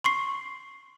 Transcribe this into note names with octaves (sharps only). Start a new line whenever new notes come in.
C6 C#6 C7